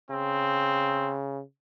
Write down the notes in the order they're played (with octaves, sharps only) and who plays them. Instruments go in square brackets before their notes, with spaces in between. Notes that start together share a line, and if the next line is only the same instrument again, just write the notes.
[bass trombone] C#3 [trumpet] C4